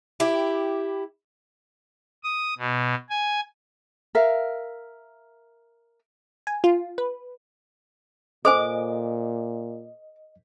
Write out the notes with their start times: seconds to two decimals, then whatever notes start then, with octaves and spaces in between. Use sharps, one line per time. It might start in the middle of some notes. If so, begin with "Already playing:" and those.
0.20 E4 G4
2.24 D#6
2.58 B2
3.10 G#5
4.15 A#4 E5 F5
6.47 G#5
6.64 F4
6.98 B4
8.45 A#2 A4 C5 D#5 G#5 D6